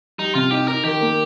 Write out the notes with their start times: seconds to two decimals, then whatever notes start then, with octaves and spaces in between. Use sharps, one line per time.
0.18 G3 D#4
0.35 C3 F4
0.51 D#4 G4
0.68 D#4 A#4
0.84 D#3 G4
1.01 A#3